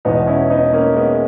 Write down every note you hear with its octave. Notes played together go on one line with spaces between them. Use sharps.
E1 E2 B2 B3 D#4
C#4 E4
B3 D#4
A#3 C#4
G#3 B3